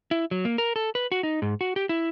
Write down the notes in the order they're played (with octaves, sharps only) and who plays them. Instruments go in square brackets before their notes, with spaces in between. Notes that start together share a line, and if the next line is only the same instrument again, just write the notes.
[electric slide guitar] E4
F#3
A#3
A#4
A4
B4
F#4
D#4
G#2
F#4
G4
E4